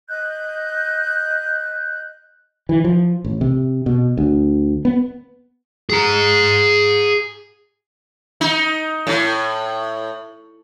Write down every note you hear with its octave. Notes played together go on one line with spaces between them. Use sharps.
D#5 F#6 G6
E3
F3
A1
C3
B2
D2
B3
G#4 A#5
D#4
A2